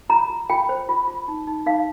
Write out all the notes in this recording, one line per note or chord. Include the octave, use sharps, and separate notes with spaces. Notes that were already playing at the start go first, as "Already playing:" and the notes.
F4 A#5
F4
F4 G5
C5
F4
F4
D#4
D#4
D#4 F5